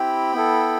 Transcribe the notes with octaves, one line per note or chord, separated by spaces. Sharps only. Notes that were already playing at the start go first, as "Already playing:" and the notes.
Already playing: C4 E4 G4 G5 B5
B3 E4 A4